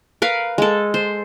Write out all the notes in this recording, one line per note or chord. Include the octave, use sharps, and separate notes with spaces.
A#4 B4 F5
G#3 A4
C5